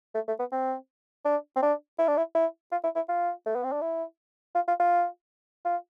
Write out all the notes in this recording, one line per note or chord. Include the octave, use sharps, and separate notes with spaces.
A3
A3
B3
C4
D4
C4
D4
E4
D4
E4
E4
F4
E4
E4
F4
A3
B3
C4
D4
E4
F4
F4
F4
F4